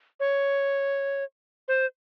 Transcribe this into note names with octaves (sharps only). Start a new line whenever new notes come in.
C#5
C5